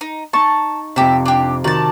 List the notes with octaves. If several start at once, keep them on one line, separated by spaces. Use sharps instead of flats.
D#4
D#4 A5 C#6
F2 C3 G4 E5
D4 G4
D#3 F#4 D5 A5